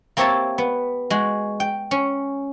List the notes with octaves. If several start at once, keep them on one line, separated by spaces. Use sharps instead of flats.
A#3 C4 G4 C#5 E5 A5
B3
G#3 F#4
G5
C#4